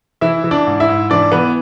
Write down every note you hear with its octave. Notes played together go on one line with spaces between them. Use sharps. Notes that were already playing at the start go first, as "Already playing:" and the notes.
E3 E4 E5
E3
D4 D5
G#2
E4 E5
G#2
E3 D4 D5
E3 B3 B4